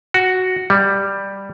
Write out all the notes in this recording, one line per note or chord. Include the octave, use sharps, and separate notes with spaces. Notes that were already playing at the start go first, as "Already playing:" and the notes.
F#4
G3